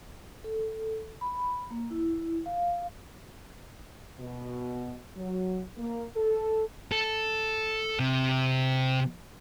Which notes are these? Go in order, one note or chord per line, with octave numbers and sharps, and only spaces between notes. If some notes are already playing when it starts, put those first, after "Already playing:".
A4
B5
A#3
E4
F5
B2
F#3
A#3
A4
A4
C3